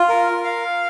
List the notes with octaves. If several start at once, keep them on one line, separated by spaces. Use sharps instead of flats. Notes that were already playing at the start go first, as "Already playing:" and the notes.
Already playing: F4
A#4
F5